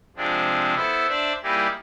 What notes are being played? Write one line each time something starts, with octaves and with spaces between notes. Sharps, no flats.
C3 F3 G#3 C4 D4
B3 E4 A4 C5
D4 C5 D5 E5
G3 A#3 D#4 E4 G4 G#4